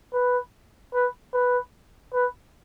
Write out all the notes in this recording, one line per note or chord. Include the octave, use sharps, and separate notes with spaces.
B4
B4
B4
B4